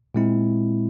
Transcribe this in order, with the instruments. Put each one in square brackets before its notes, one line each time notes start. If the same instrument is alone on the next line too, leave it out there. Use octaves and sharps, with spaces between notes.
[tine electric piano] A#2 G#3 C4 E4